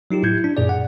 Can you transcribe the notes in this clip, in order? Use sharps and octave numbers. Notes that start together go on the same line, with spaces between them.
F#3 D#4 F4 G4
A2 E4 G6 G#6
D4
F#2 A#2 G#4 D5
F#5